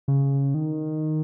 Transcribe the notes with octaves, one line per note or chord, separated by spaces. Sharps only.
C#3
D#3